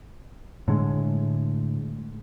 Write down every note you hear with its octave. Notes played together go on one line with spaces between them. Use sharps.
A2 D3 G#3